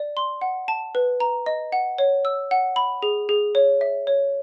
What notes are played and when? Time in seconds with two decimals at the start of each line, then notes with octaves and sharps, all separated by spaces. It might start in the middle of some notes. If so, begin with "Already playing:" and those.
Already playing: D5
0.17 C6
0.41 F#5
0.68 A5
0.95 B4
1.20 A#5
1.46 D#5
1.72 F#5
1.98 C#5
2.25 E6
2.51 F#5
2.76 B5
3.02 G#4
3.29 G#4
3.55 C#5
3.81 E5
4.07 C#5